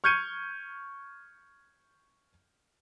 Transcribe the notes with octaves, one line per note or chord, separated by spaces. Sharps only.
C#6 F6 G6 G#6 C#7 D#7